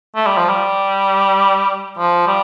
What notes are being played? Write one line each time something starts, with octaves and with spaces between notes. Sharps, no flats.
A3
G3
F3
G3
F3
G3